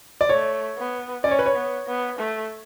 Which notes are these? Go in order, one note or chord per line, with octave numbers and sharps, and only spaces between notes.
D5
A3 C#5
B3
C#4 D5
C#5
B4
C#5
B3
B3
A3